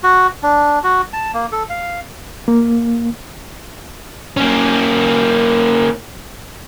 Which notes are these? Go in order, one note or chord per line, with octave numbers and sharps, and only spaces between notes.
F#4
D4
F#4
A5
A#3
A4
F5
A#3
A#3 C#4